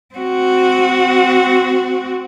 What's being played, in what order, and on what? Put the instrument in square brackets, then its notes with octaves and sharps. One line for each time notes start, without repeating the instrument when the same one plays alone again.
[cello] C4 F#4